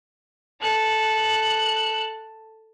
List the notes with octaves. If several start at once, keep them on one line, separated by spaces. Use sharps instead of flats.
A4 F#6